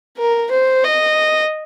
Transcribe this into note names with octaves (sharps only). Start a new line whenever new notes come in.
A#4
C5
D#5